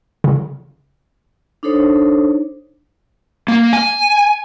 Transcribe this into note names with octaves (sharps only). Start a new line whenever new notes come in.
C#3
D4 D#4 A4 C5 C#5
A#3
G#5